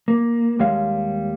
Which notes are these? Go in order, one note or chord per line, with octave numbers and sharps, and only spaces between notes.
A#3
D#2 G3 G#3 C#5 F5